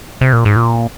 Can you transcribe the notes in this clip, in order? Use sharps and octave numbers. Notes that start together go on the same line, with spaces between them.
C3
A#2
G#2
A#2